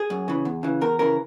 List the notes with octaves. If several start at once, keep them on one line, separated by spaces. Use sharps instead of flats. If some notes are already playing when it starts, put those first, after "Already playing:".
Already playing: G#4
F#2
C#3 E3
E2
C#3 E3
E2 A#4
C#3 E3 A#4